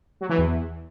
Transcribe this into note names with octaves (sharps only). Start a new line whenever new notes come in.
F#3
E3
E2